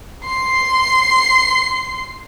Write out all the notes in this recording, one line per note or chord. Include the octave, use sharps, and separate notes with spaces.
C6 C7